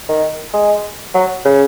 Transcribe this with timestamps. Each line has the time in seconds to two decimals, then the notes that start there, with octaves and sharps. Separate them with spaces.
0.09 D#3
0.54 G#3
1.15 F#3
1.45 C#3